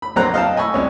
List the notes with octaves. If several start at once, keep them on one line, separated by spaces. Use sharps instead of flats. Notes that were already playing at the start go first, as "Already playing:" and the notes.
B5
A#1 F#3 C4 F#5 A#5 F#6
D#5 F5 G5 A5
D#5 G#5 B5 C#6 E6
C2 C#4